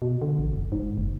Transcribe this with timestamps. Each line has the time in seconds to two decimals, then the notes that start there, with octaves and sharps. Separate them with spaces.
0.02 B2
0.22 D3
0.39 A1
0.53 F#1
0.72 G#2
0.98 F#1